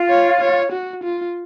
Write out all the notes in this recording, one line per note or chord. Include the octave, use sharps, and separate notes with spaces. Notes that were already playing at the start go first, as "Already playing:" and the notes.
Already playing: F4
C#5
C#5
F#4
F4